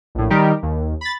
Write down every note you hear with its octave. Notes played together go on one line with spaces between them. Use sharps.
A#1 A2
D#3 G3 D#4 G4 A#4
D#2
B5 A6